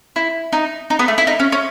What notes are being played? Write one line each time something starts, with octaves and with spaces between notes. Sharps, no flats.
E4
D#4
D#4
B3
A3
E4
D#4
C#4
C#4